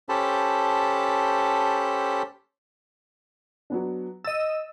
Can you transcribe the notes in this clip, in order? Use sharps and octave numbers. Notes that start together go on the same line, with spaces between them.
C#4 G4 A4 C5 A5 B5
F#3 B3 D4
D#5 E6 A6